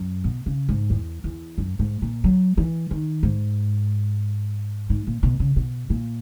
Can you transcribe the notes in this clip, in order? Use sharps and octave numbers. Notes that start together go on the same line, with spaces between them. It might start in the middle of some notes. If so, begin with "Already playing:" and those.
Already playing: F#2
B2
C#3
G#2
E2
E2
F#2
G#2
A#2
F#3
E3
D#3
G#2
G#2
A#2
B2
C#3
B2
A#2